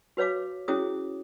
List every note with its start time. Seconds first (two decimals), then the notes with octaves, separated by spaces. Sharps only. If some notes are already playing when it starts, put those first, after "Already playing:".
0.17 F#4 B4 C#5 F5 D6
0.68 C#4 E4 F#4 G#4 C#5 D#6